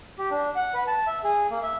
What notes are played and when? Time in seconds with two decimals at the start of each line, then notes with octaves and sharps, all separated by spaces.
0.18 G4
0.30 D4
0.56 F#5
0.74 B4
0.87 A5
1.07 E5
1.24 G#4
1.50 A#3
1.63 E5